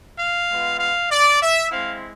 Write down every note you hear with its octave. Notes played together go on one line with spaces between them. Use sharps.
F5
G#3 B3 F4
F5
D5
E5
G#3 C4 E4 F5